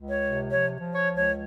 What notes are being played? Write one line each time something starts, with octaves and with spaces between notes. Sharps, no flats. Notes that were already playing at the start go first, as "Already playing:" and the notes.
Already playing: C#2
C#5
C3
F3 C#5
F3
C#5
C#2
C#5